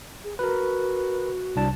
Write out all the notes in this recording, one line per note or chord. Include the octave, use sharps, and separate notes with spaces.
G#4
F#4 A#4 B4
C2 D4 A5